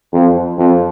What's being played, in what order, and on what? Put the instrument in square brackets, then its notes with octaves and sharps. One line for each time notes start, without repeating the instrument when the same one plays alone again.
[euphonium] F2
F2